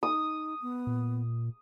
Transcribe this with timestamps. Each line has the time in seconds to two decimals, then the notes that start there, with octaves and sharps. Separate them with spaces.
0.03 D#4 D#6
0.62 B3
0.87 A#2